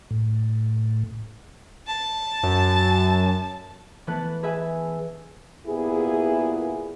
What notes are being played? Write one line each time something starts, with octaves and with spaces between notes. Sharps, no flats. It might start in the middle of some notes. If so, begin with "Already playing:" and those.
A2
A5
F#2
E3 A3 B3 B4 A5 F#6
G#4 B4 E5 G#5
A#2 B3 E4 G4 G#4